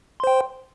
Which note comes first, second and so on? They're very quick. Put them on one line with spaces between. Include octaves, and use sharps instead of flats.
C6 C5 G5